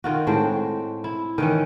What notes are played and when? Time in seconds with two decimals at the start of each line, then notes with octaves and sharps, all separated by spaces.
0.04 D#3 F4 F#4
0.27 A2 G#3 C4
1.04 E4
1.38 D#3 E3 C#4